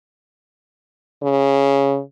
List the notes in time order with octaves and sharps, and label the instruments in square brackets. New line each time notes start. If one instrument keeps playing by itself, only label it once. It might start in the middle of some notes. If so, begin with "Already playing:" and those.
[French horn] C#3